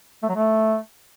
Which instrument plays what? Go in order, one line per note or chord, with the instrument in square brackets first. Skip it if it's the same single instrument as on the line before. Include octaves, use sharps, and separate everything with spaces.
[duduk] A3
F#3
A3